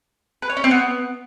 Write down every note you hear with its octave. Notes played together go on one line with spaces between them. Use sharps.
B4
C#5
C#4
C4
B3